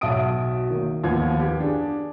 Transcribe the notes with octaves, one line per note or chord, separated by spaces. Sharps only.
B1 F#4 E5 A5 D#6 D7
D#3 A#3
D#2 F3 B3 G#6
G4
D4 G#4